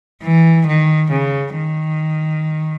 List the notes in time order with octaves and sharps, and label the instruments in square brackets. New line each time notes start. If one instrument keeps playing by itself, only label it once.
[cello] E3
D#3
C#3
D#3